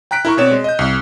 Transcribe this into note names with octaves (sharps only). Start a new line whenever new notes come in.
G5 A#5 F#6 B6 D7
E4 A#4 A#5 C#6
B2 C4 C#5 D5 E7
G#3
D#5 G6
C2